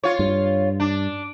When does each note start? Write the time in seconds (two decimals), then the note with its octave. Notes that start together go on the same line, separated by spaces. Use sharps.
0.03 F4 C#5
0.19 G2
0.80 D4